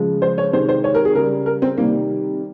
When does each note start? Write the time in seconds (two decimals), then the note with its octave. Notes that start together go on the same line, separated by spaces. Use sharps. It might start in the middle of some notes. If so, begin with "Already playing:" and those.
Already playing: C#3 F3 G#3
0.22 C5
0.38 C#5
0.53 C3 D#3 G#3 C5
0.69 C5
0.84 C#5
0.95 A#4
1.05 G#4
1.15 C#3 G3 A#4
1.46 A#4
1.62 C4
1.77 C3 D#3 G3 A#3